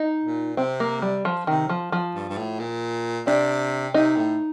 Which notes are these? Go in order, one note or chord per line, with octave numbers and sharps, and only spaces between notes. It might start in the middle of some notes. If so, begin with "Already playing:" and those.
Already playing: D#4
A#2
C3 C4
A#3
G3
F3
C3 D#3
F3
F3
G2
G2
A2
A#2
C3 D4
C3 D#4
A2